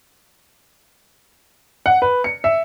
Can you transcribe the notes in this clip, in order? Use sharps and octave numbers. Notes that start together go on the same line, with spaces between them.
F#5
B4
C#7
E5